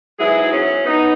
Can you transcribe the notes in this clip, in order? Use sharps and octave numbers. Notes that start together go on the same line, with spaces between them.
G#2 F#3 B3 E4 G#4
C#4
B3 D#4